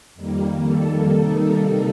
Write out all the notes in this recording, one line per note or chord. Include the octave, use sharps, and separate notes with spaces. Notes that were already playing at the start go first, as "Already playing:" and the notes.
F2 D#3 G3 A#3
A4
C3 D#3 G3 A#3 D#4 A4